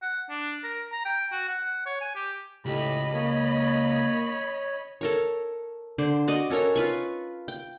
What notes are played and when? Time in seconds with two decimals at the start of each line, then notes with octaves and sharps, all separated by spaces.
0.02 F#5
0.30 D4
0.64 A#4
0.92 A#5
1.05 G5
1.32 F#4
1.49 F#5
1.86 C#5
2.01 G#5
2.15 G4
2.66 C#2 A2 G4 D#5 B5
3.13 A#3 C#5
5.01 A4 A#4 C#5
5.98 D3 C5 D5
6.28 F#4 D5 D#5
6.50 C#4 A4 A#4 C#5
6.76 F4 B4 C#6
7.48 G5